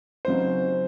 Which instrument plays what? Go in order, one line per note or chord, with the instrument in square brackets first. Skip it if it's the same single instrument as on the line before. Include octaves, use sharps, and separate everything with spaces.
[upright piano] C#3 F#3 C4 D#4 C5